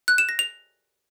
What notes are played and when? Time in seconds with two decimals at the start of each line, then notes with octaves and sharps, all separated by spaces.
0.08 F#6
0.18 E7
0.29 A#6
0.39 F7